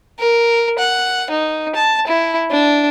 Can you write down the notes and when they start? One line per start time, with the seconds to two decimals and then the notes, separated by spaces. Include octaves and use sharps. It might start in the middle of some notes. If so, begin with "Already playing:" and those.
0.19 A#4
0.79 F#5
1.30 D#4
1.76 A5
2.07 E4
2.51 D4